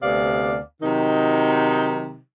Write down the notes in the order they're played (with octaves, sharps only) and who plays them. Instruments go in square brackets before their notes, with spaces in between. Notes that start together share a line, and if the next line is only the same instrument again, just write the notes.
[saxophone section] D2 C3 B3 D5 F5
C3 D#3 F#3 D#4